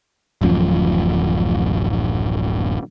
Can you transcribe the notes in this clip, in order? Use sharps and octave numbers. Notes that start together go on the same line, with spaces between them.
D1 A1 F#2 F3